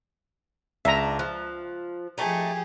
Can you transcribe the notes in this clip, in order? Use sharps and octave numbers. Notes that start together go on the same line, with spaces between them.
C#2 D4 E5 A#5 D#7
F3 F#6
F3 A3 D#4 G4 G#4